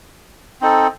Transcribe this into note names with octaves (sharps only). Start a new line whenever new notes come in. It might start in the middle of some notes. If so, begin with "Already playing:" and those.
C4 D#4 A4